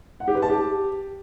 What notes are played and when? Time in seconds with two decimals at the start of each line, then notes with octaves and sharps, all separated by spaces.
0.20 F#5
0.28 G4
0.35 B4
0.42 A5
0.50 G4